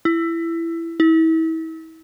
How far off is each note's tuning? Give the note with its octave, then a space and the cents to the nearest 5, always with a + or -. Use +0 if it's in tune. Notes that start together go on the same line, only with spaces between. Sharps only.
E4 +15
E4 -35